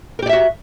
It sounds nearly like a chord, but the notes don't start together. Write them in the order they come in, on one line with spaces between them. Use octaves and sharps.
A#4 G4 D5 E5 F#4